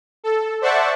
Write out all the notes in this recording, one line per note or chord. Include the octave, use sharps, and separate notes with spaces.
A4
C5 D5 E5 F#5 A5 C#6